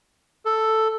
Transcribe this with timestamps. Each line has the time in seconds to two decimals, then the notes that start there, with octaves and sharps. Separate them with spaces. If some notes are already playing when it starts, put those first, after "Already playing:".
0.45 A4